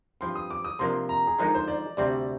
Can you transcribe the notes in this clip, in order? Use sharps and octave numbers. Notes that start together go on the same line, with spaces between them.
G2 F3 C4 C6
D#6
D6
D#6
C3 F3 A#3 D4 C6
A#5
G#4
D3 F3 G#3 D#4 A#4
C5
D5
D2 C3 G3 C4 D5